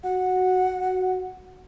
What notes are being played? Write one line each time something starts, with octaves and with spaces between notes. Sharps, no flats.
F#4 F#5